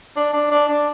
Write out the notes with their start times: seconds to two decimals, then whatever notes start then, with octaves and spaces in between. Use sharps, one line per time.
0.16 D4
0.33 D4
0.51 D4
0.69 D4